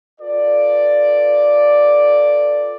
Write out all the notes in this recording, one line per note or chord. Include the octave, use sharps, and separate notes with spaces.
F4 A4 B4 D5